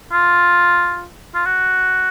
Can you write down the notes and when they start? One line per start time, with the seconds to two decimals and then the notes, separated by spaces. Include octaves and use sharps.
0.12 F4
1.35 F4
1.46 F#4